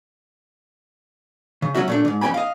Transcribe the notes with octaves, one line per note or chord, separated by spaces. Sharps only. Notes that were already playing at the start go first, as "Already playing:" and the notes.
C#3
F#3 G#3 C#4 F#4 E5
A#2 A3 D4
D2 G#2
F2 C#4 B4 G5 G#5 B5
D#5 F5